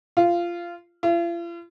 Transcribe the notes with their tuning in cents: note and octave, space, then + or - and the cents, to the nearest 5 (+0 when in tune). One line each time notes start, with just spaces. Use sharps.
F4 -15
F4 -45